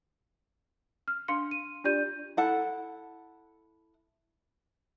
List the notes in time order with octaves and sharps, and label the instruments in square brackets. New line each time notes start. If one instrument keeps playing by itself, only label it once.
[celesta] F6
D4 F5 C6 C#7
D#7
D4 F4 G4 D5 G6 D#7
[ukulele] E4 A4 F#5 A5